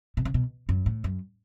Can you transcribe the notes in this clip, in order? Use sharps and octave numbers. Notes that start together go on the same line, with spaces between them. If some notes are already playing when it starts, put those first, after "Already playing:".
B2
C#3
B2
F#2
A2
F#2